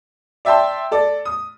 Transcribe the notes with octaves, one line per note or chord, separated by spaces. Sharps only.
D5 E5 G5 A5 C6
A4 D5
D#6